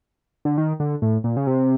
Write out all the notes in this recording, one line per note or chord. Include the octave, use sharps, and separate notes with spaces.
D3
D#3
D3
A2
A#2
C#3
C3